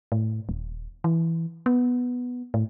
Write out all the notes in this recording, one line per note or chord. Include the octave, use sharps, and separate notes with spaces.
A2
D#1
E3
B3
A2